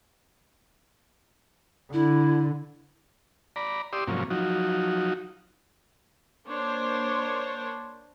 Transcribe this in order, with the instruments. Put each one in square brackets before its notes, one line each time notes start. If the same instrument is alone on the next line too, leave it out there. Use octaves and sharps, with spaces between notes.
[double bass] D3 [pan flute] E4
[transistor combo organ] D5 A#5 B5
G4 D5 C6 D#6 E6
G#2 C3 F3 F#3 A#3 C#4
F3 F#3 D#4 F#4
[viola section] A#3 D4 C5 C#5